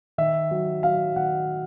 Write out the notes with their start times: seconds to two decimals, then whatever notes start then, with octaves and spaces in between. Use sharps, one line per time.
0.18 D#3 E5
0.51 F#3
0.83 F#3 F5
1.16 D#3 F#5